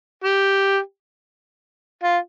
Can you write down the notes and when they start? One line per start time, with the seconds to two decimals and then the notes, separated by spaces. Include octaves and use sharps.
0.24 G4
2.04 F4